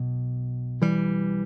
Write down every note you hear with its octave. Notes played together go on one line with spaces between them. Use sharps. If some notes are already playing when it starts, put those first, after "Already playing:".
Already playing: B1 B2
E3 G3